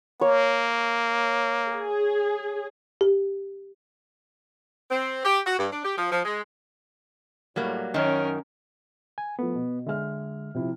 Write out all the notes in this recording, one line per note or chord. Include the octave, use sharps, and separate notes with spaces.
A#3 C#5
G#4
G4
C4
G4
F#4
G2
D4
G4
F3
F3
G#3
A2 F#3 G3 A#3
F#2 D#3 C#4 A#4 C#5
G#5
F3 A3 B3
B2
D3 G#3 E5 F6
C3 F3 E4